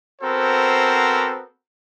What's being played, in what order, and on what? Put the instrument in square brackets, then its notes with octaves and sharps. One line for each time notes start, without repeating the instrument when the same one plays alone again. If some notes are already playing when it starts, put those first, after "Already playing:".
[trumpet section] B3 C4 F#4 A4 A#4 C5